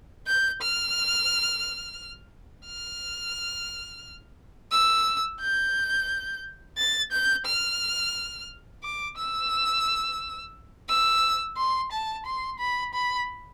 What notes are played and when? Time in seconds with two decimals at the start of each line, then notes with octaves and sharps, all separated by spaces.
0.27 G6
0.62 F6
2.66 F6
4.71 E6
5.41 G6
6.78 A6
7.12 G6
7.46 F6
8.84 D6
9.17 E6
10.89 E6
11.57 C6
11.92 A5
12.26 C6
12.59 B5
12.94 B5